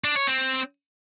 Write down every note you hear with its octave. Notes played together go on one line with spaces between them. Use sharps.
D4
C#5
C4